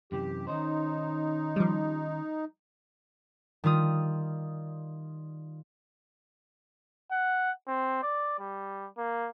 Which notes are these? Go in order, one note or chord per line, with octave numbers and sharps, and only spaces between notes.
F#2 C3 E3 G4
D#3 C#4 D#4 C5
F3 G3
D#3 G3 F4 D#6
F#5
C4
D5
G3
A#3